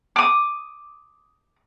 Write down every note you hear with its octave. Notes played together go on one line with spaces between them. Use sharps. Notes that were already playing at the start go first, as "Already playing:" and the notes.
D6 D#6